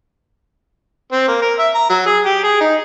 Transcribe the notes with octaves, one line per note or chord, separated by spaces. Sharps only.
C4
A#3
A#4
E5
A#5
F#3
G#4
G4
G#4
D#4